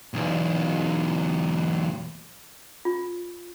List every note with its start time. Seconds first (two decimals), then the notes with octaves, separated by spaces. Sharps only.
0.14 B1 E2
2.85 F4